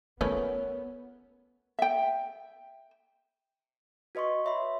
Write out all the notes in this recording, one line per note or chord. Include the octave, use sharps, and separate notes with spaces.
A3 B3 C#4 F4 A#4 B4 C#5
E5 G5
F#4 B4 D#5 C6 C#6
C#5 E5 B5 C6